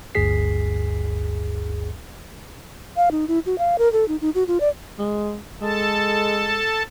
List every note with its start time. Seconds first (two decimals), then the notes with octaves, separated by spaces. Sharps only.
0.15 G1 D2 G2 G#4 B6 C7
2.97 F5
3.11 D#4
3.28 E4
3.46 F#4
3.58 F5
3.79 A#4
3.93 A4
4.08 D#4
4.21 D#4
4.35 F#4
4.48 F4
4.60 D5
4.99 G#3
5.62 G#3 A4 A5